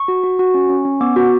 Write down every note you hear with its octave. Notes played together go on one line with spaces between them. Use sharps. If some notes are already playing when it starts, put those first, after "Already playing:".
Already playing: C#6
F#4
F#4
F#4
C#4
C#4
C#4
B3 D6
F#4